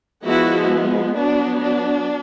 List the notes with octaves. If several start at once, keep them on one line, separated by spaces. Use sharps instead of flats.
F3 G#3 B3 E4 F#4
F#3 B3 D4
D4